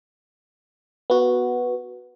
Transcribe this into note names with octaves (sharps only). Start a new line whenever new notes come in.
B3 F#4